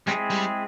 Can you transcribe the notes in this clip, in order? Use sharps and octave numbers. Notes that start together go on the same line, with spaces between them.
G3 G#3 C4 E4 G#4
G3